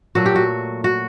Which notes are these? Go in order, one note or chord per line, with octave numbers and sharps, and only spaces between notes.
A#2 F#3 A3 F#4
G4
F#4
F#4